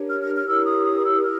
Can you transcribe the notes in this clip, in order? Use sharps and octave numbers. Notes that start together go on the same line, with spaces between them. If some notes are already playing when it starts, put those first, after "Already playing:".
Already playing: D4 G4 A#4 C#5
F6
F6
F6
E4 G4 A#4 C#5 E6
D#6
D#6
E6
E4 F6